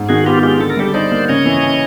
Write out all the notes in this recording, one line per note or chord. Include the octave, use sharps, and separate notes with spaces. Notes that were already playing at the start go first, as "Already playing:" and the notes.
Already playing: G#2
D#3 F#4 G#4
B3 F4 G4
G#3 F4 G4
D3 A4
A#4
G3 G4 A4
D#4 C5 D5
A#3
C#3 C#5 D#5
E3
C#4